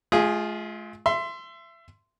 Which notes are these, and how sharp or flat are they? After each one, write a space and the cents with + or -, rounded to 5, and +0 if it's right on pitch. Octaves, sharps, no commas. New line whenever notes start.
A3 -45 F4 +0 G#4 -10
E5 +25 C6 -5